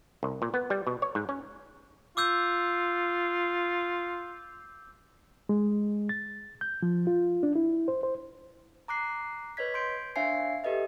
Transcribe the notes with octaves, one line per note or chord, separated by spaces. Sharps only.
C2
A#2
B3
G3
B2
C#5
G#2
C#4
F4 D6 E6 G6
G#3
A6
G6
F3
F4
D4
E4
C5
C5
A#5 D6 F#6 C7
B4 C#5 D#5 G#6 B6
C6 G6 D7
D4 C#5 E5 F5 G#5 C7
G4 A4 B4 D#5 E5